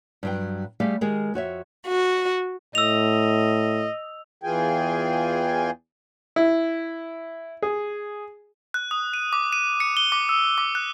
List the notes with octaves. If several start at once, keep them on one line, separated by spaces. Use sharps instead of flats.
G2 F#3 G5
G3 A3 G4 G#4 F5
D#3 G#3 G4 G#4 A#4
F2 F#4 C#5 E5
F#4
A2 D#5 E6 F7
E2 E3 F4 G#4 G5 G#5
E4
G#4
F#6
D#6
D#7
D6
D#7
C#7
G7
D6
E6
D6
F#6